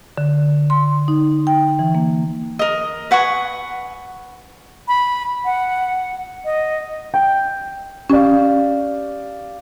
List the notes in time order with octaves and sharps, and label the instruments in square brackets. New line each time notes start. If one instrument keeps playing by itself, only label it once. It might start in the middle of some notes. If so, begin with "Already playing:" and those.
[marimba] D3
C6
D#4
G5
E3
A#3
[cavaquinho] A#4 D#5
B4 F#5 G#5 C#6
[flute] B5
F#5
D#5
[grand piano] G5
[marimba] C#4 [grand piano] G4 D5 F5